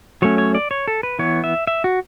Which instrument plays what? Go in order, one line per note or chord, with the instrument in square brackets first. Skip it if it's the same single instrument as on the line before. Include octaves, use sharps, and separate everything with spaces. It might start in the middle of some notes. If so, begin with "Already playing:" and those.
[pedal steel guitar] F#3 A3 C#4 C#5
C#5
D5
C#5
A4
B4
E3 B3 C#5
E5
E5
F#4